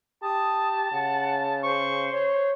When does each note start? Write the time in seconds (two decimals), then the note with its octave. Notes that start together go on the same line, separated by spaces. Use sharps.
0.23 G4 A5 D#6
0.92 C#3 F#5
1.63 C5 C#6
2.13 C#5